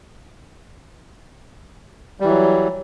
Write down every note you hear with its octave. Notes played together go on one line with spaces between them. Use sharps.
E3 F#3 G3